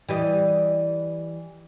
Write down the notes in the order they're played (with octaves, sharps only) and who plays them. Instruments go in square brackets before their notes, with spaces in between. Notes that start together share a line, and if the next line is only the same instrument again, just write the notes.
[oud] E3 G3 D#5